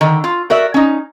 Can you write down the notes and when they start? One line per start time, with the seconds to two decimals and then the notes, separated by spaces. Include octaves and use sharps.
0.01 D3 D#3
0.24 F4
0.50 F#4 A#4 D5 E5
0.74 C#4 D#4